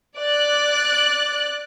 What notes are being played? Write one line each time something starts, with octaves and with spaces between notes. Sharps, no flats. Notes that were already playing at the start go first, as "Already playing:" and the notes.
D5 F#6